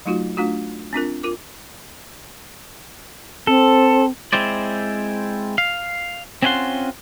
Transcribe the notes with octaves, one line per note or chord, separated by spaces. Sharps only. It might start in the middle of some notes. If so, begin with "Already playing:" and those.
F#3 A3 D#4 F4 F#4
A3 D4 F4 F#4
C4 D4 F4 A#4
F4 A#4 D6
C4 A4
G#3 C4 E4 C5 D5
F5
C4 C#4 E4 F4 F#5 C6